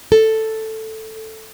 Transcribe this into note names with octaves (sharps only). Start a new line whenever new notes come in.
A4